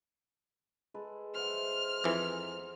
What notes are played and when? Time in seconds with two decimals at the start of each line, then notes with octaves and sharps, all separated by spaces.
0.94 G#3 A4 B4
1.35 C5 E5 F#5 F6
2.04 F2 E3 C5 A#5